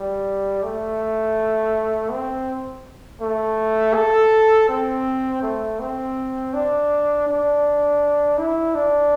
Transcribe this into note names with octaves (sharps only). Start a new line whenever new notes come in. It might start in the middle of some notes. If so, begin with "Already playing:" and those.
Already playing: G3
A3
C4
A3
A4
C4
A3
C4
D4
D4
E4
D4